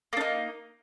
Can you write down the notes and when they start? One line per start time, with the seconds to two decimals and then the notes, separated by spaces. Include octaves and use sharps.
0.13 A#3
0.17 D4
0.21 D#4